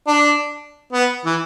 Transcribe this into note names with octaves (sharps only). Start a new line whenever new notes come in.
D4
B3
E3